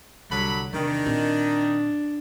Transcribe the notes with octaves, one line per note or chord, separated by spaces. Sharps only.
C2 D3 F#3 B5
E2 C3 D#3 D4
A#2 C4